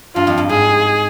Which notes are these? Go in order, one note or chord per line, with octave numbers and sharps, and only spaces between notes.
G2 F4
F2
G2
G#2 G#4